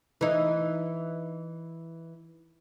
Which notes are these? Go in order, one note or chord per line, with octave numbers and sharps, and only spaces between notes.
E3 D#4